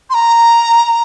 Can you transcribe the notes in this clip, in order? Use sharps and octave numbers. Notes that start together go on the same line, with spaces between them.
C6
A#5